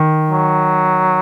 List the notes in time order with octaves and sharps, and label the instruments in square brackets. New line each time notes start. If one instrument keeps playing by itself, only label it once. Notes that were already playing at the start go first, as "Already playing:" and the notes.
Already playing: [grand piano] D#3
[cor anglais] F#3